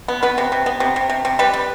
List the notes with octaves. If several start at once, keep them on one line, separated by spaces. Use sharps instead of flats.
B3
B3 B4
C3
C3
B3
C3
C3
C3
C3
G3 B4
G3